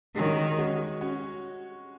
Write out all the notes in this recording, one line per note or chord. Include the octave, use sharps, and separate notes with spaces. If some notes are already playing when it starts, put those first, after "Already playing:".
D#3 G#3 C#4 F#4 C#5
G#3 C#4 F#4 C#5
C#4 F#4 C#5